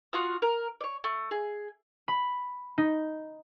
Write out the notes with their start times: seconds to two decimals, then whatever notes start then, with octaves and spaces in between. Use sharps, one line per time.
0.13 F4 F#4 F5 D#6
0.42 A#4
0.81 C#5 D5
1.04 A3
1.31 G#4
2.08 B5
2.78 D#4